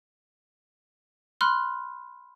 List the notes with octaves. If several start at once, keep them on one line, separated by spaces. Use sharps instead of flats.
B5 C6 F6 F#6